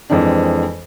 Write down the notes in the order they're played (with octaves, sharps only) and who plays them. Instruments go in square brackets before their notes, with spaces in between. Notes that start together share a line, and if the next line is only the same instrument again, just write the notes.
[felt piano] F2 E3 G#3 C4 D4